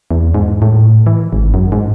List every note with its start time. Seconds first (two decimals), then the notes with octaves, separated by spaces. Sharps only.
0.11 E2
0.34 G#2
0.62 A2
1.07 E3
1.33 G#1
1.54 F#2
1.72 G#2